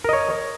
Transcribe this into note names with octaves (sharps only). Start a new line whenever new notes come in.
A#4 C#5 D#5